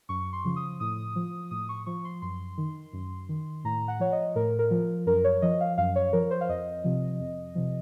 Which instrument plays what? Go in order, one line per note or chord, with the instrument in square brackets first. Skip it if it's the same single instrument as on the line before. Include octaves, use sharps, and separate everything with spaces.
[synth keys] F#2 C#6
C6
C#3 F3
D#6
A2 D#6
F3
A2 D#6
C#6
F3 C#6
C6
F#2 C6
D#3
F#2
D#3
A2 A#5
F#5
F3 C#5
D#5
A2 A#4
A#4
F3
F#2 A#4
C#5
F3 D#5
F5
F#2 F5
C#5
F3 A#4
C5
F5
F2 D#5
C3 F3
F2
C3 F3